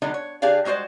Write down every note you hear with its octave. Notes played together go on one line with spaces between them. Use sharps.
D3 F#3 G#3 B3 D4 D#4
C#5
D3 D4 G4 G#4 D5 F5
G3 G#3 F#4 C5 D5